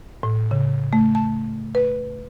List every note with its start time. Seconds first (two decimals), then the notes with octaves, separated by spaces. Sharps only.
0.23 A2
0.51 C#3
0.93 A3
1.15 A5
1.75 B4